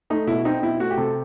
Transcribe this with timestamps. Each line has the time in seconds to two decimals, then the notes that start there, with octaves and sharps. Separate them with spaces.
0.10 A3 D#4
0.27 B2 E4
0.45 C4 D#4
0.63 B2 E4
0.80 A3 F#4
0.90 G4
0.98 C3 A4